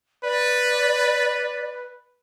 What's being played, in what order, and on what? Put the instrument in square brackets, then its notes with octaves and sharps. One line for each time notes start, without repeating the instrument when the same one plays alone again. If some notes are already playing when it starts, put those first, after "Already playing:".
[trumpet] B4 [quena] D5